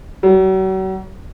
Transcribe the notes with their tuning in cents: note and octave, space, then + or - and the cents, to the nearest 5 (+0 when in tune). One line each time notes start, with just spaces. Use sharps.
F#3 +40